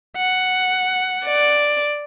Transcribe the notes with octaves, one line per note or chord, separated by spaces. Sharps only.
F#5
D5